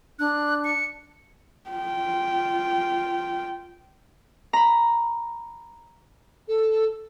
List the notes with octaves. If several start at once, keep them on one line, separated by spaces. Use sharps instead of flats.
D4 F#6
C#7
F4 G5
A#5 B5
A4